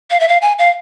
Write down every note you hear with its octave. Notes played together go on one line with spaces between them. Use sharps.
F5
E5
F5
G#5
F5